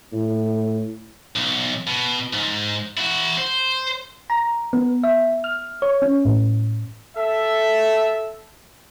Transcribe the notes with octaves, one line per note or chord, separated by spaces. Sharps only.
A2
B1
B2
G#2
E4 F#4
C5
A#5
B3
E5
F6
C#5
C#4
A2
A4 E5